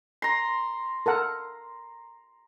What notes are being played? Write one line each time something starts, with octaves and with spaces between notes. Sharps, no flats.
A#5 C6
A4 A#4 F#5